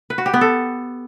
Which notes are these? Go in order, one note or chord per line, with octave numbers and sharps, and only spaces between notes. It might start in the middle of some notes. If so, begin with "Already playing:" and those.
B4
F#4
G4
B3
A4